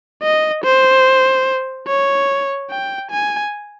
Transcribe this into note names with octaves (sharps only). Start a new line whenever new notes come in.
D#5
C5
C#5
G5
G#5